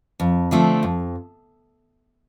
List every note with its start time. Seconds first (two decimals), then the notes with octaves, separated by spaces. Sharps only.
0.20 F2
0.51 D3 F3 A3 C4
0.83 F2